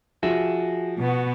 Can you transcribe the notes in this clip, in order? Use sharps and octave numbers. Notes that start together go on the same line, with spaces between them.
F3 F#4 G#4 E5
B2 B3 F#4